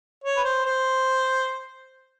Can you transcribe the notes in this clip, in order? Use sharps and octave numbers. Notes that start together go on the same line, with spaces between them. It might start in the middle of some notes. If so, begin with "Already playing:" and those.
C#5
B4
C5
C5